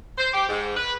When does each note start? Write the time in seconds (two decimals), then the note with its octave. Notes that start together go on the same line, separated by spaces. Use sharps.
0.18 C5
0.33 G4
0.49 G#2
0.77 B4